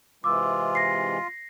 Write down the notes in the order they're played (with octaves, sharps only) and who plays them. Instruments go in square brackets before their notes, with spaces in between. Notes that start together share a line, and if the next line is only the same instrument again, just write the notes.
[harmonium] C3 E3 G#3 [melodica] F4 [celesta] D6 E6
[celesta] A#6 C7